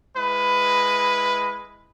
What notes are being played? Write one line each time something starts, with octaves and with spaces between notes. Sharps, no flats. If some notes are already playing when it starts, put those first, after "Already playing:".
G#3 E4 B4